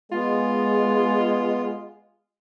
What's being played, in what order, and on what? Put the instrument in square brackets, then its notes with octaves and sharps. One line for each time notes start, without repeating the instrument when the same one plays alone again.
[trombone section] G#3 [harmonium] B3 [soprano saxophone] F4